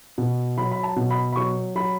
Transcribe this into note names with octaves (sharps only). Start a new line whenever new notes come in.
B2
F#3 B5
B5
A5
B2
B5
B5
F#3 C#6
F#3 B5